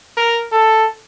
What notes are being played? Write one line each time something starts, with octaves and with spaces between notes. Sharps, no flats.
A#4
A4